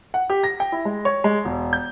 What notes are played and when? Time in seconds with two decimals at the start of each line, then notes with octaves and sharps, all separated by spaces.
0.14 F#5
0.30 G4
0.43 A#6
0.60 G5
0.72 E4
0.85 G#3
1.05 C#5
1.24 G#3
1.45 E1
1.73 G6